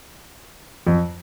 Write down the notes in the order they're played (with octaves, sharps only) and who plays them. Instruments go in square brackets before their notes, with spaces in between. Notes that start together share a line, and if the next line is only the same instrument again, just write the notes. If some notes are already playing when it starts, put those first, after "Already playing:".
[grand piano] F2